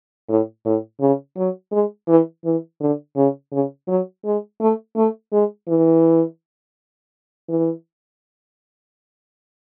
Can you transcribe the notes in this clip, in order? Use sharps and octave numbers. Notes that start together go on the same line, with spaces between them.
A2
A2
C#3
F#3
G#3
E3
E3
D3
C#3
C#3
F#3
G#3
A3
A3
G#3
E3
E3